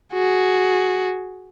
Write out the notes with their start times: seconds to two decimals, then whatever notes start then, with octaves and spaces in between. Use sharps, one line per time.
0.13 F#4 G#4